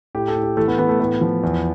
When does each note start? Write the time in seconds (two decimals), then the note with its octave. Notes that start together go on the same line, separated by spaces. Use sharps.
0.15 A2 G4
0.28 A4
0.35 A2
0.43 G4
0.57 E3 A3
0.68 B3
0.78 E3 B3
0.89 A3
1.00 A2 B3
1.21 F3
1.43 E2